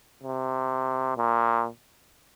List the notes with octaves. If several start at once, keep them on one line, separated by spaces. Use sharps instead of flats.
C3
A#2